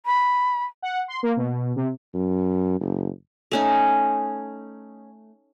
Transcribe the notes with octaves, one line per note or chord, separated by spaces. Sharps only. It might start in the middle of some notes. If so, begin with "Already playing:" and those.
B5
F#5
C6
A#3
B2
C3
F#2
F#1
A3 C#4 D#4